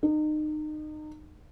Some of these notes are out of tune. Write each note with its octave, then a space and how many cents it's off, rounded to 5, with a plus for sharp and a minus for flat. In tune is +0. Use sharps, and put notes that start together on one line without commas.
D#4 -30